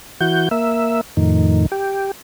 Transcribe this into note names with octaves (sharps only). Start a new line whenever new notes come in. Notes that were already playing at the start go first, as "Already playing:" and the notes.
E3 F#4 G6
A#3 E5
F2 A2 D#3
G4